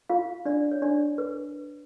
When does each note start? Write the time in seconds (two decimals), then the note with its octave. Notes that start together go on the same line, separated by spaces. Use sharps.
0.10 F4 F5
0.45 D4 D5
0.71 C#5
0.82 D4 D5
1.18 B4